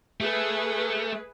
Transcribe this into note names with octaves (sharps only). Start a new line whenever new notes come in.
A3 G#4 B4